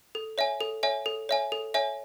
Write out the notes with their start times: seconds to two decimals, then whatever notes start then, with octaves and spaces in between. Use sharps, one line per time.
0.15 A4
0.38 C#5 E5 G#5
0.61 A4
0.83 C#5 E5 G#5
1.06 A4
1.29 C#5 E5 G#5
1.52 A4
1.74 C#5 E5 G#5